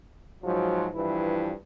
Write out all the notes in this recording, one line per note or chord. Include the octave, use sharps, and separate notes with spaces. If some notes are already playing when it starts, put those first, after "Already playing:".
G#2 F3 F#3
G2 E3 F3 E4